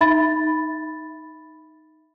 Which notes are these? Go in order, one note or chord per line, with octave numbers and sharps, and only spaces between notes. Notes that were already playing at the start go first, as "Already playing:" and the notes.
D#4 E5 B5 A6